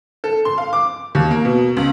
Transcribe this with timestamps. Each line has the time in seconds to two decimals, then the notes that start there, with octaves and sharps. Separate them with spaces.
0.24 A4
0.45 C6
0.58 F5
0.73 D6
1.15 D#2
1.31 A#3
1.45 B2
1.77 C#2